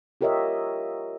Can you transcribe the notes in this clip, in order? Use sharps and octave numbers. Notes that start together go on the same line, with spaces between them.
F4 G4 A#4 C#5 D#5 E5